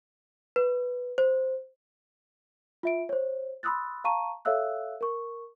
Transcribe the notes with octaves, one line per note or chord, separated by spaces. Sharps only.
B4
C5
F4 E5 D7
C5 C#5
B5 C6 D#6 E6 F#6 A6
F5 A5 A#5 C#6 D#7
A4 C#5 E5 F5 E6 F#6
A#4 C#6